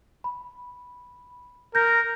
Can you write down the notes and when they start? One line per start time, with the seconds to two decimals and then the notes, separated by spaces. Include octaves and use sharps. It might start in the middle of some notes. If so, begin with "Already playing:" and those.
0.24 B5
1.75 A#4 G6 A#6